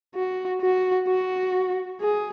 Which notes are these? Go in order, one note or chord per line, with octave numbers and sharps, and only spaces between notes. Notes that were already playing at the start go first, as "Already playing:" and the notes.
F#4
F#4
F#4
G#4